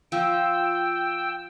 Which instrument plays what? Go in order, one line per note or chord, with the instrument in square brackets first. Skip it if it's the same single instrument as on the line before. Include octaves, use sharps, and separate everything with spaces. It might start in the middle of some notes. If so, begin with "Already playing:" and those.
[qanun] F3 [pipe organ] G5 E6